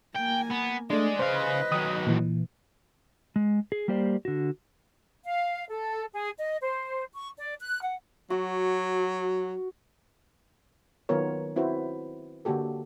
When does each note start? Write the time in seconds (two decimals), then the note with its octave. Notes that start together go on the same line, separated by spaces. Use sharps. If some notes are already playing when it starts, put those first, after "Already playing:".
0.16 A#3 G5 G#5
0.51 B3
0.90 G#3 A3 D4 D5
1.19 C#3 B4 C5 D#5 F5
1.72 D#3 F#3 D#6
2.07 A#2 E3
3.36 G#3
3.72 G#4
3.88 G3 A#3 G4 C5 D5
4.25 D3 F#4
5.24 F5
5.69 A4
6.13 G#4
6.38 D#5
6.61 C5
7.14 C#6
7.37 D5
7.60 F#6
7.82 F#5
8.30 F#3 F#4
11.09 D#3 F#3 B3 F4 A#4 C#5
11.56 C4 E4 F#4 B4 C5
12.45 D3 A#3 F#4 G4 A4